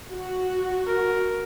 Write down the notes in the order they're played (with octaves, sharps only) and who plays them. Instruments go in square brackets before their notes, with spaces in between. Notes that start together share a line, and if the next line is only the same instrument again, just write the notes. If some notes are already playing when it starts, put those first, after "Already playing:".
[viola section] F#4
[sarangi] A#4